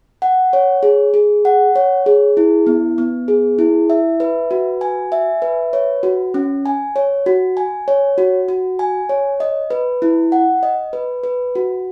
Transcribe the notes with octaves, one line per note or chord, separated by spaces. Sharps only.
F#5
C#5
G#4
G#4
F#5
C#5
G#4
E4
B3
B3
G#4
E4
E5
B4
F#4
G#5
E5
B4
C#5
F#4
C#4
G#5
C#5
F#4
G#5
C#5
F#4
F#4
G#5
C#5
D#5
B4
E4
F#5
D#5
B4
B4
F#4